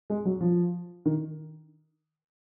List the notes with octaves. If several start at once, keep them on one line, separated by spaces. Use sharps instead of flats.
G#3
F#3
F3
D#3